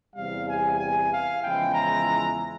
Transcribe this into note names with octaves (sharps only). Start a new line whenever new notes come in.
E2 C3 G3 F5
G#5
G#5
F5
E2 C#3 F3 G#3 E4 G5
A#5